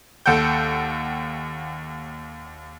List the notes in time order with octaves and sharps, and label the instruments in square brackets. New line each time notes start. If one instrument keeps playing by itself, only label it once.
[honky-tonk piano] D#2 A4 F#5 G5 G6